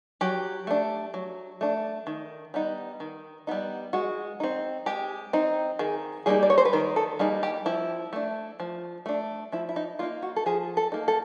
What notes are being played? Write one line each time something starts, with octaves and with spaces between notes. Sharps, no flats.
F#3 G4
A3 D4
F#3
A3 D4
D#3
G3 B3 D#4
D#3
G3 B3 D#4
G#3 F#4
C4 D#4
G#3 G4
C4 D#4
D#3 G#4
G3 A#3 D#4 G#4
D5
C#5
C5
B4
D#3 A#4
A4
G3 A#3 D#4 G#4
G4
F3 E4
A3 D4
F3
A3 D4
F3 E4
E4
D#4
A#3 D#4 F4
F#4
A4
F3 G#4
A4
A#3 D#4
A4